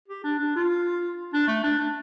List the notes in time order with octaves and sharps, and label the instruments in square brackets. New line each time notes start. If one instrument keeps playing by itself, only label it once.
[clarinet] G4
D4
D4
F4
D4
A3
D4
D4